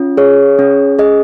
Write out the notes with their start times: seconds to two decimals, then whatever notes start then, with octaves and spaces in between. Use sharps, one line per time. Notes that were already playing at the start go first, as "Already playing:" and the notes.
Already playing: C#4 F4
0.17 G#4 C#5
0.59 C#4
0.99 G#4 D#5